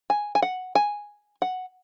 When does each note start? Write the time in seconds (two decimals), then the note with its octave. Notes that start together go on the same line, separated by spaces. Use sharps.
0.10 G#5
0.35 G#5
0.42 F#5
0.75 G#5
1.42 F#5